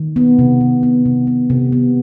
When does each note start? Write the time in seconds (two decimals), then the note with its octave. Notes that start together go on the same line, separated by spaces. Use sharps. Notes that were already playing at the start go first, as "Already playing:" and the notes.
Already playing: D#3
0.16 B3
0.39 C3
0.61 C3
0.83 B3
1.05 C3
1.27 B3
1.50 C3
1.72 B3